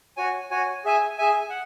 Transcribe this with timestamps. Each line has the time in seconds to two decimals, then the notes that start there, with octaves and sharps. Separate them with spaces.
0.17 F#4 C#5 G#5
0.51 F#4 C#5 G#5
0.85 G#4 E5 G#5
1.18 G#4 E5 G#5
1.50 F#5